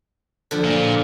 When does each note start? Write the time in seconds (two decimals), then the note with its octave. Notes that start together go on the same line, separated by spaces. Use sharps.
0.51 D3 F3
0.64 A#2